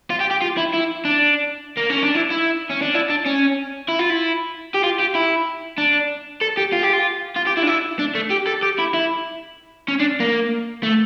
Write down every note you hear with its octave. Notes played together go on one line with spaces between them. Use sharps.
F4
G4
G4
F4
E4
E4
D4
A#3
C#4
D4
E4
E4
C#4
D4
E4
D4
C#4
E4
F4
E4
G4
F4
G4
E4
D4
A4
G4
F4
G4
F4
F4
G4
E4
D4
E4
D4
A3
G4
A4
G4
E4
E4
C#4
D4
A#3
A3